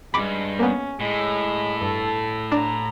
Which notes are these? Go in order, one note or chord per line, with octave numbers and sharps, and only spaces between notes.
E2 G2 G#3 B5 D6
A#3 B3 C#4
A2 G#3
G2 A4
D4 A#5